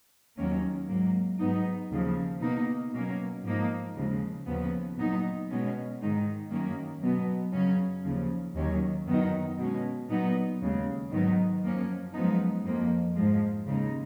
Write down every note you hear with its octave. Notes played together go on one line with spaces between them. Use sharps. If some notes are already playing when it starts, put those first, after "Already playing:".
D#2 D#3 F#3 A#3 C#4
G#2 F#3 A#3
G#2 F#3 B3 D#4
D#2 C#3 F3
B2 A#3 D#4
B2 F#3 A#3 C#4
G#2 F3 A#3 D#4
D#2 C#3 F3 G#3
D#2 C#3 F3 B3
A#2 F#3 B3 D#4
B2 G#3 C#4
G#2 D#3 G#3 D#4
F#2 D#3 A#3 C#4
B2 F#3 B3
F#2 C#3 F#3 C#4
D#2 C#3 F3
D#2 D#3 F#3 C#4
F#2 D#3 F#3 B3 D#4
B2 G#3 C#4
A#2 F#3 B3 D#4
D#2 C#3 G#3
G#2 D#3 F#3 B3 D#4
F#2 F3 A#3 C#4
F#2 F3 G#3 B3 D#4
F2 F3 A#3
G#2 F3 G#3
D#2 C#3 G#3 D#4